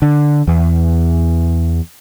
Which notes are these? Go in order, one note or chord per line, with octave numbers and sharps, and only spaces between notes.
D3
E2